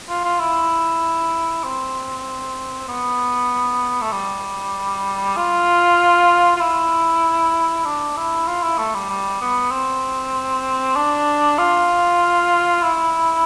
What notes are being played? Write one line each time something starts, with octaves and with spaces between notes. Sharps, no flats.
F4
F4
E4
C4
B3
A3
G3
F4
F4
E4
D4
E4
F4
E4
A3
G3
G3
B3
C4
D4
F4
E4